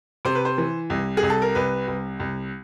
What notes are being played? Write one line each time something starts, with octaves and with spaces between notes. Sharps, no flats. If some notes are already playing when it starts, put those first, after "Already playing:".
C3 C5
B4
C5
E3
C2
G#4
C2
A4
A#4
C2 B4
C2
C2